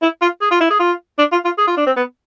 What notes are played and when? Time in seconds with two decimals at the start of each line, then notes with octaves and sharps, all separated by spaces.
0.02 E4
0.21 F4
0.41 G#4
0.51 F4
0.61 E4
0.70 G#4
0.80 F4
1.19 D4
1.32 F4
1.45 F4
1.58 G#4
1.67 F4
1.77 D4
1.87 C4
1.96 B3